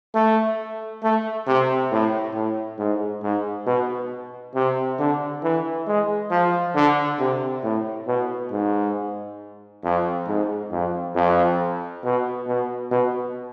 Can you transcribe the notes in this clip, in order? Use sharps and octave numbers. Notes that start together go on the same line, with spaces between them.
A3
A3
C3
A2
A2
G#2
G#2
B2
C3
D3
E3
G#3
F3
D3
C3
A2
B2
G#2
F2
G#2
F2
F2
B2
B2
B2